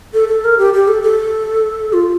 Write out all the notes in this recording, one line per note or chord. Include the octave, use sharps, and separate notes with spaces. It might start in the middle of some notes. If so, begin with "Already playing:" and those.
A4
A4
A#4
G4
G4
A4
A4
F4